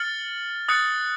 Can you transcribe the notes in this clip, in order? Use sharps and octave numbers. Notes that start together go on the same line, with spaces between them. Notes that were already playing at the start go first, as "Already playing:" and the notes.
Already playing: F6 A6 C#7 F#7
D#6 F#6 A6 C#7